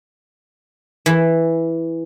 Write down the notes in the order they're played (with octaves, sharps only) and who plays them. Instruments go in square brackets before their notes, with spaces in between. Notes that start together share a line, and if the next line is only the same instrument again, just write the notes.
[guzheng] E3